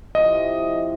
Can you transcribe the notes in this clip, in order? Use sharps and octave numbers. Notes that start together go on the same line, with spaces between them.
A2 C3 F3 D#5